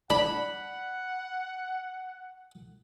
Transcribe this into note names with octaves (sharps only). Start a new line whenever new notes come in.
D4 F#5 B5